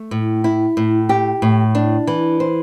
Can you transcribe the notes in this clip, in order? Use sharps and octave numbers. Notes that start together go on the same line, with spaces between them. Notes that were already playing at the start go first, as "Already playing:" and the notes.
Already playing: A3
A2
E4
A2
G4
A2
D4
E3
C5